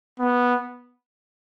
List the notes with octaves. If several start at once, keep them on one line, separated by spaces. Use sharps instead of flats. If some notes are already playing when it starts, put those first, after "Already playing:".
B3